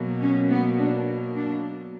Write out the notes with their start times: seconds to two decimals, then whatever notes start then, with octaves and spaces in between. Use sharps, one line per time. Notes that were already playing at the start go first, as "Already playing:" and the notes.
Already playing: B2 F#3 A#3
0.21 C#4
0.49 B3
0.78 D4
1.35 D4